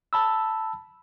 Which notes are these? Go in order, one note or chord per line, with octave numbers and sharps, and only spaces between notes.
A5 B5 E6